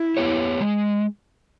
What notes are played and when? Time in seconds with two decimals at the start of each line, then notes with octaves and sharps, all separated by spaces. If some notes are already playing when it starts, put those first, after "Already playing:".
Already playing: E4
0.17 B3 G4 C#5
0.61 G#3